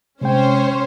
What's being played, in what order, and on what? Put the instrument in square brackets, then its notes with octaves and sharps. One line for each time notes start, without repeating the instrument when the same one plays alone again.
[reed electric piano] C3 G#3 G5 [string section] C#4 C5 C#5